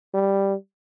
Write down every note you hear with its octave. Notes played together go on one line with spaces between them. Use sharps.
G3